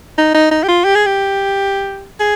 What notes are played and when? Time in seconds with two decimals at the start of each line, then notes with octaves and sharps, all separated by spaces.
0.18 D#4
0.34 D#4
0.51 D#4
0.64 G4
0.68 F4
0.85 G4
0.95 G#4
1.06 G4
2.20 G#4